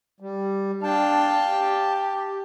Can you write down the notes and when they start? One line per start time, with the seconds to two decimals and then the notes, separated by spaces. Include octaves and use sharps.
0.20 G3
0.83 D4 F5 G5 A5
1.50 G4